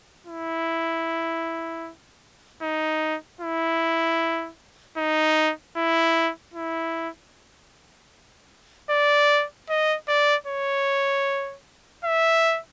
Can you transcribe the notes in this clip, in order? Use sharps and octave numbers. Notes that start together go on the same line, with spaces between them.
E4
D#4
E4
D#4
E4
E4
D5
D#5
D5
C#5
E5